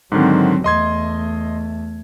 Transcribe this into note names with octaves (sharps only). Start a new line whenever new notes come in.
G#2 D3 D#3 F#3 C4
E2 A3 D#5 C6 G#6